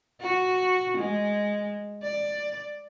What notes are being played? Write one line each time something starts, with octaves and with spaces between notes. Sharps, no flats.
F#4
G#3
D5